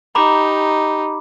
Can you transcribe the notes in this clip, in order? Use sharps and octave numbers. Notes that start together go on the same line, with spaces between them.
D#4 G4 A#5 B5 D6